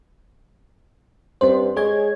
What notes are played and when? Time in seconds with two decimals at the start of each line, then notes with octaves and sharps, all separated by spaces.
1.41 G2 C4 C#4 C5
1.76 G#3 G#4 C#5 G#6